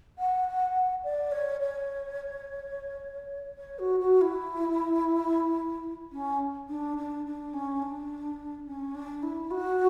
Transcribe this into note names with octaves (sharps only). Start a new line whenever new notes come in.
F#5
D5
C#5
C#5
C#5
F#4
F#4
E4
C#4
D4
D4
D4
C#4
D4
C#4
D4
E4
F#4